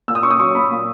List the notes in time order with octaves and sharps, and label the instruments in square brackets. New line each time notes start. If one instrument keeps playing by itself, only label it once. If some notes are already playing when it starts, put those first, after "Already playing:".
[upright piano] A#2 E6
D#6
C#4 C#6
D#6
F#3 C#6
A#2 B5
A#2